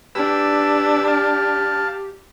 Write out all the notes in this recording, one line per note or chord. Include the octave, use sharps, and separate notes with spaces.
D4 G4 B4 E6
F5 A5